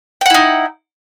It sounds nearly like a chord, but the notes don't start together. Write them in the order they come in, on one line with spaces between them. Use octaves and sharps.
G5 F#5 E4 D#4